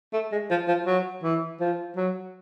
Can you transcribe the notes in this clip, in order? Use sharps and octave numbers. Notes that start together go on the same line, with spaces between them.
A3
G#3
F3
F3
F#3
E3
F3
F#3